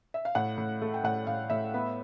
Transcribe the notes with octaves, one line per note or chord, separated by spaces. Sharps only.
E5
F5
A2 F#5
A2
A3
G5
A2 F#5
A2 F5
A2 E5
B3